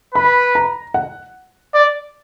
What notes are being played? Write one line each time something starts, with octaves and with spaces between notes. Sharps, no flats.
B4 B5
A#5
F#5
D5